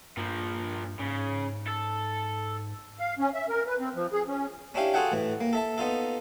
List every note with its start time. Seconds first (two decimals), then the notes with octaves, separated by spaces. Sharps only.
0.17 G2 A#2 F3
1.00 G#2 C#3
1.68 A4
2.99 F5
3.19 C#4
3.34 E5
3.49 A#4
3.67 B4
3.80 C4
3.95 F3
4.13 G#4
4.28 C#4
4.74 C#4 D4 E4 G4 F5
4.94 F4 F#4 G#4 A4 F#5 G5
5.12 A2 E3
5.41 A#3
5.53 A4 E5 A5
5.78 B3 D#4 F4 A4